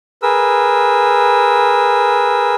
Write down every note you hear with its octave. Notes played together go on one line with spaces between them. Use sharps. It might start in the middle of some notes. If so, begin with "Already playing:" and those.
G#4 A#4 B4 E6